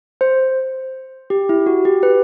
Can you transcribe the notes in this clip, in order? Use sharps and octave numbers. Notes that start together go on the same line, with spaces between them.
C5
G4
E4
F#4
G4
B4